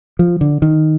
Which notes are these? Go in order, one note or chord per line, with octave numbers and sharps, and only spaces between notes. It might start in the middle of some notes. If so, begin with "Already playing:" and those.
F3
D3
D#3